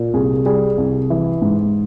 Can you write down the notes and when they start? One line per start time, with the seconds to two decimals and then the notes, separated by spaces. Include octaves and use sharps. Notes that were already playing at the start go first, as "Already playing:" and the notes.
Already playing: A#2
0.14 C2 G#4
0.46 G3 G#4
0.78 C2
1.10 E3
1.42 G#2